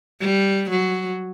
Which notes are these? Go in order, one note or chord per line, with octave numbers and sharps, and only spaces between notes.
G3
F#3